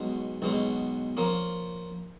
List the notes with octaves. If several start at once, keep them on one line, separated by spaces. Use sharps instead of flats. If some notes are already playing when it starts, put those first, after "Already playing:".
Already playing: B1 B2 G#3 C#4
B1 B2 G#3 C#4
F3 A#3 C#4